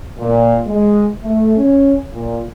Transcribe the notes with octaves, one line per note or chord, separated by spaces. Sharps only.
A#2
G#3
A3
C#4
A#2